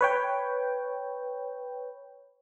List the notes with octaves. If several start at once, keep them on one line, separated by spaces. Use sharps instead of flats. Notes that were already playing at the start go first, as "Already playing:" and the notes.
B4 C#5 G5